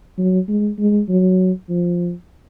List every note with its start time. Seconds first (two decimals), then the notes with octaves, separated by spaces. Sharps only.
0.18 F#3
0.48 G#3
0.79 G#3
1.09 F#3
1.69 F3